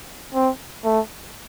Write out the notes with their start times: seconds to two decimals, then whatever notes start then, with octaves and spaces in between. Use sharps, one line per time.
0.34 C4
0.85 A3